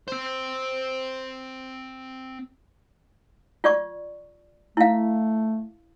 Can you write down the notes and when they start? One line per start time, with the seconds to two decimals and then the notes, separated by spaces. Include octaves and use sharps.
0.08 C4 C5
3.64 F4 D5 C#6
4.77 A3 E4 F5